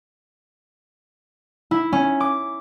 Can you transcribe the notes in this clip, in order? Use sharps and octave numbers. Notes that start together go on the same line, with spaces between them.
E4
C#4
D6